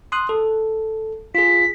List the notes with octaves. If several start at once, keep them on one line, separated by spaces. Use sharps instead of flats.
C6 D#6 F#6
A4
F4 G#4 B6